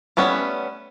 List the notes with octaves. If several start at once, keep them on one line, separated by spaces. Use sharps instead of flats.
G3 A3 B3 C#4